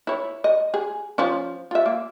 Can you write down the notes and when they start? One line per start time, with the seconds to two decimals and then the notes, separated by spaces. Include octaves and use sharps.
0.07 E4 C#5
0.44 D#5
0.74 G#4
1.18 F3 C#4
1.71 F4 E5
1.86 A#3